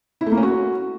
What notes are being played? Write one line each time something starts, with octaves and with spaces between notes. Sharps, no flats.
E4
A3
A#3
C#4
F#4